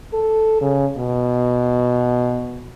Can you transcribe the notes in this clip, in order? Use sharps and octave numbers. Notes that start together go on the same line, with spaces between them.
A4
C#3
B2